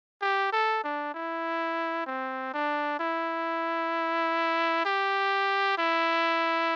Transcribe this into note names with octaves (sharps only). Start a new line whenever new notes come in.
G4
A4
D4
E4
C4
D4
E4
G4
E4